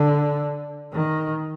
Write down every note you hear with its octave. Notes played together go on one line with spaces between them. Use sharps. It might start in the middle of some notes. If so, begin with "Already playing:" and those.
Already playing: D3
D#3